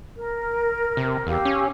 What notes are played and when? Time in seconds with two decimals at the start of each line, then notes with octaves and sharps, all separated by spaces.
0.18 A#4
0.97 C3
1.27 E2 G4 F5 E6
1.45 C#4